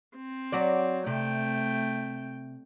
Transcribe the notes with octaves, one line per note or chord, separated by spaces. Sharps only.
C4
F#3 F#4 D5
C3 A3 G5